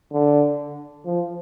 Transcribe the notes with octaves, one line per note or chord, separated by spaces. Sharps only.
D3
F3